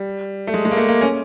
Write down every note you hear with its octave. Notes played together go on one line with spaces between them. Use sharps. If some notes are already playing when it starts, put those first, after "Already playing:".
Already playing: G3
A3
G#3
G#3
A#3
A3
A#3
C#4